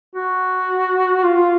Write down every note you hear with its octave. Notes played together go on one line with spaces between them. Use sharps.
F#4
F4